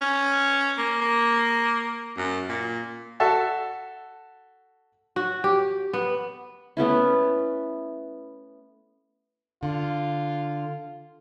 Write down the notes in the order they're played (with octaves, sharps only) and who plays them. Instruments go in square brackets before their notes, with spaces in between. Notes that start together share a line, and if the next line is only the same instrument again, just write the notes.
[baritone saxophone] C#4
A#3
A#3
F#2
A#2
[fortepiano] F#4 A4 E5 A5
[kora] F#4
G4
B3
[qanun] A3 B3 C#4 E4
[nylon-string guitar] D3 [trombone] F4